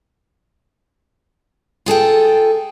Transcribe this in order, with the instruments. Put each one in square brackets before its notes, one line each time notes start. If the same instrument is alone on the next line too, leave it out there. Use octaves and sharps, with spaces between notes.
[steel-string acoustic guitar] F4 G#4 A4 G5